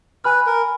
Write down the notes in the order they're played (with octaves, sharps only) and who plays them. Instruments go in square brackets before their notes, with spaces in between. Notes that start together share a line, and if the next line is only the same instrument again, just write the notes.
[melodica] B4 [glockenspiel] G#5 B5 F6
[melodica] A#4